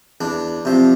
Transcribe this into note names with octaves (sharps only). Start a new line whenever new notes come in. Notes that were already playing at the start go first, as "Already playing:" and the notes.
E2 D4
C3 F3